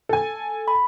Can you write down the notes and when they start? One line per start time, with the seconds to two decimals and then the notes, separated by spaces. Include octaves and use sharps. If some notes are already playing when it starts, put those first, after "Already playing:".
0.09 A4 G#5
0.68 B5